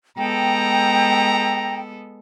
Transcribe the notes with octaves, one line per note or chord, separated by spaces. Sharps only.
G#3 B3 A4 G5 A#5